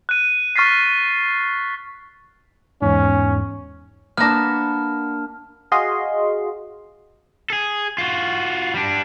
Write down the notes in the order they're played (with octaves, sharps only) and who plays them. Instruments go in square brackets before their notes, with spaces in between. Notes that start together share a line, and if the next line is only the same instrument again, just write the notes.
[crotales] F#6 D#7
C#6 F6 A6 B6 C7
[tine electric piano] E2 G#2 [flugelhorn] C#4
[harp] A#3 D4 [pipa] B3 A#5 [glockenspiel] A5 F6
[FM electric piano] F#4 G#4 D#5 F5 C6
[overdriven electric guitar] G#4 A4
F4 F#4
G3 D4